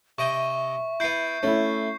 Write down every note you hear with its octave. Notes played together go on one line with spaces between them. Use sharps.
C3 D#5 E5 G5 C#6
B3 E4 G6 C7
A3 C#4 E4